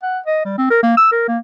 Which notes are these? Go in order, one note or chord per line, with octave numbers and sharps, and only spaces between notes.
F#5
D#5
G3
C4
A#4
A#3
E6
A#4
A#3